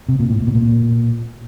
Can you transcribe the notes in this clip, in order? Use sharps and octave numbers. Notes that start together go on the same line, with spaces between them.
C3
A#2
A2
A#2
B2
A#2